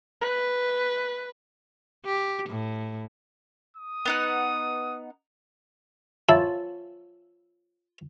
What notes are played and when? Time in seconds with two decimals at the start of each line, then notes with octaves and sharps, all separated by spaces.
0.21 B4
2.05 G4
2.49 A2
3.77 D#6
4.05 B3 D#4 F#5
6.29 E4 F4 C#5 A5